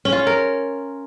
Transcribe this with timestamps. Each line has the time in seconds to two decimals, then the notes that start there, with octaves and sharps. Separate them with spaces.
0.05 C#4
0.12 F4
0.19 C#5
0.27 A#4